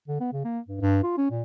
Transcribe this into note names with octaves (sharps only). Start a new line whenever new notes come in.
D3
B3
C#3
A#3
G2
G2
F4
C#4
A#2